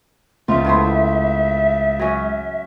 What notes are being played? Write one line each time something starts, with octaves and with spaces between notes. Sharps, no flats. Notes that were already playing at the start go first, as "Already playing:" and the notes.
C#2 F3 F4 E5
A2 B3 C5
F#3 C#4